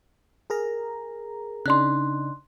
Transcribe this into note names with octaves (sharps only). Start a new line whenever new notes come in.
G#4 A#4 A#5
C#3 D4 D#4 C6 F#6